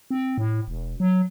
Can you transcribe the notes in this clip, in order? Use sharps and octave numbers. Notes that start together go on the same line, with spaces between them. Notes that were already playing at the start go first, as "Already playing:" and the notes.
C4
A2
E1
F#3